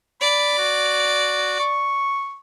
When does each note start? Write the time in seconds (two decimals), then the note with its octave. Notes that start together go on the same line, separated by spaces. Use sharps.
0.21 D5 B5
0.58 F#4
1.59 C#6